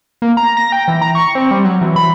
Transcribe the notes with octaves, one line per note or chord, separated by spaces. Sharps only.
A#3
A#5
A#6
G5
E3
A#5
C#6
C4
G3
F#3
E3
B5